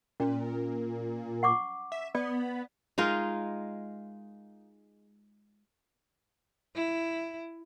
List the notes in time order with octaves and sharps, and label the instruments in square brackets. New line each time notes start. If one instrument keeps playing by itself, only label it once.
[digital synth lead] A#2 [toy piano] C#4
[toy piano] F#5 C#6 D6
[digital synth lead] E5
[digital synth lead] B3 [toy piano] D5
[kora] G#3 D#4 F4 A#4
[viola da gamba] E4